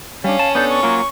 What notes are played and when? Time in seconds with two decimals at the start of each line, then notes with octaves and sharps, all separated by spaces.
0.24 G3 C#4 D4 F5
0.39 A5
0.55 B3 D4 A4 G6
0.69 C#6
0.83 F#3 A#3 F4